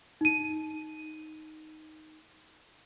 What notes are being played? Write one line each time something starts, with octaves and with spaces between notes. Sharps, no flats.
D#4 D#7